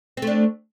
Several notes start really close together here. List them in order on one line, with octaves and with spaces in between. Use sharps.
C4 A3 D4